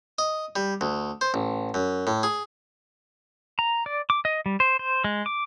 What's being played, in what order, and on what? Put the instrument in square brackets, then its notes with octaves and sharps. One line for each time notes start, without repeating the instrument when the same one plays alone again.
[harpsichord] D#5
G3
D2
C5
A1
F#2
A2
G#4
[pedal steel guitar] A#5
D5
D6
D#5
G3
C5
C5
G#3
D6